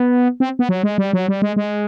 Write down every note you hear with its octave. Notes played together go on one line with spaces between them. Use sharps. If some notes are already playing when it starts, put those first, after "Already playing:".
Already playing: B3
C4
B3
F#3
G#3
G3
F#3
G3
G#3
G#3